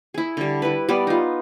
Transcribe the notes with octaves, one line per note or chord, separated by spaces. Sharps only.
E4 G#4
D3 G3
E4 B4
G3 B3 B4 D5
D#4 F4